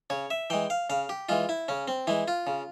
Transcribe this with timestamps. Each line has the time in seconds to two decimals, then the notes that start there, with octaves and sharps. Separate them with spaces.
0.10 C#3 C#5
0.30 E5
0.50 E3 G#3 G5
0.70 F5
0.90 C#3 F5
1.09 G4
1.29 E3 G#3 F4
1.49 E4
1.68 C#3 C#4
1.88 C4
2.07 E3 G#3 E4
2.28 F4
2.47 C#3